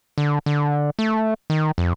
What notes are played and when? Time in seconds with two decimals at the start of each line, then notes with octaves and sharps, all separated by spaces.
0.18 D3
0.46 D3
0.99 A3
1.50 D#3
1.78 F2